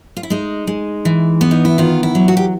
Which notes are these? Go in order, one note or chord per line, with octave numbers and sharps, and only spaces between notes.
F4
E4
G#3 D#4
G#3
E3
B3
D#4
E4
D#3 F4
E4
F#3
F#4
G4